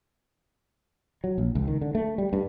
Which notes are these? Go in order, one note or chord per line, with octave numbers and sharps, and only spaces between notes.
F#3
A#1
C#2
D#3
D3
A3
G3
G2